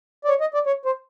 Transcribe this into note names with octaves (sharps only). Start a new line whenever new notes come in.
D5
C#5
D#5
D5
C#5
C5